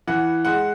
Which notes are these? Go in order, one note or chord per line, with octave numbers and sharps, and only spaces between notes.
E3 F#5
G#3 F#5